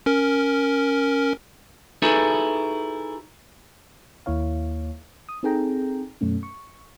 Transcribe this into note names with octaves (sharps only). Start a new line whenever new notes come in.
C#4 A#4
D#4 E4 F#4 G#4 A4 B4
D#2 A#3 E4 C#5 F5
D#6
C4 D#4 G#4 A4 G5 A#5
F#2 B2 A3 C#4
C#6